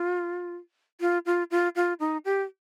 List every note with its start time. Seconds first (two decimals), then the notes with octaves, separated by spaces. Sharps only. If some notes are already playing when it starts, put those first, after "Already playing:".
Already playing: F4
1.01 F4
1.26 F4
1.51 F4
1.76 F4
2.00 D#4
2.25 G4